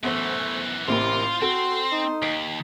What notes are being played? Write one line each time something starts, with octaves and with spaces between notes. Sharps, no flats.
F#2 E3 A3 B3 C5
A1 C3 A#3 F4 C5 B5
C4 F#4 A4
D#4
D#2 B6 C7 D7